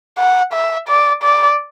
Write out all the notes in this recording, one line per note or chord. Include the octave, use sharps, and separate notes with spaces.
F#5
E5
D5
D5